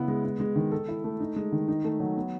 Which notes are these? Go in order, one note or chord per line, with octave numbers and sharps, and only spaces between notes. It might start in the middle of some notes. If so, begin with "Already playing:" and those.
Already playing: C#3 B3 E4
G#3
B3
G#3
D#3
A4
E4
A3
D#4
G#3
D#3
D#4
A3
F#3
B3